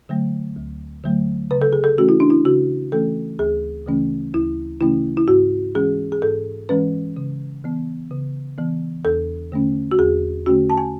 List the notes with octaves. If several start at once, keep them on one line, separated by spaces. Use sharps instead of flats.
D3 F#3 A3
D2
D3 F#3 A3
C#3 B4
A4
G#4
A4
E3 A3 C#4 F#4
E4
D4
E4
C#3 F#4
E3 A3 C#4 A4
D2 G#4
C#3 E3 A3 C#4
D2 E4
C#3 E3 A3 C#4 E4
E4
G#2 F#4
E3 G#3 C#4 G#4
G#4
G#2 A4
E3 G#3 C#4 B4
C#3
E3 B3
C#3
E3 B3
E2 A4
D3 A3 C#4
F#4
E2 G#4
D3 A3 C#4 F#4
A5
G#5